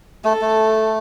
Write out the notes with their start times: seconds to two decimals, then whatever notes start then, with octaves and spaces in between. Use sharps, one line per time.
0.24 A3 A4
0.41 A3